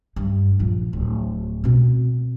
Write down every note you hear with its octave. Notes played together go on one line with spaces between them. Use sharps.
G2
A#1 F3
D1
B2 C4